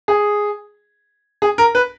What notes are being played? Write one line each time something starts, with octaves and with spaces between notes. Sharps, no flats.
G#4
G#4
A#4
B4